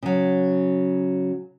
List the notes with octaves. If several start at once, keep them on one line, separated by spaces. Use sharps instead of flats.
C#3 F#3